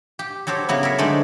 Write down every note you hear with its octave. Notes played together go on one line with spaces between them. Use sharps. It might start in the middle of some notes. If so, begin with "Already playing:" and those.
G4
F#3 G4 A4 C5 C#5
C#3 F#3 B3 E4
A#4 C#5 E5
D3 G#3 A3 D#4 C5 D5